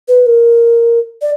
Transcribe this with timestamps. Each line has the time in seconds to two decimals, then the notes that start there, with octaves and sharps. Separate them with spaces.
0.08 B4
0.26 A#4
1.22 D5